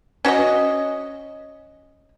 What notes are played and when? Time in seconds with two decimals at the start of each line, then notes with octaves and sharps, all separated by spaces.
0.25 C#4 F#4 C#5 D#5